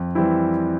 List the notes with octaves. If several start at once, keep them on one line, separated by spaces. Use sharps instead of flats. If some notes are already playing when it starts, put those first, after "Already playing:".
Already playing: F2
E3 G3 C4 E4